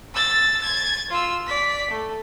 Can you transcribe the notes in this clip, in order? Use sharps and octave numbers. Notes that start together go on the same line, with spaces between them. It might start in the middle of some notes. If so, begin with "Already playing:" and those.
E6 A6
G#6 A6
F4 E6
D5 B6
A3